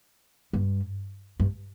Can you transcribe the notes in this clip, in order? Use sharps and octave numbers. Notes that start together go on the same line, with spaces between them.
G2
G2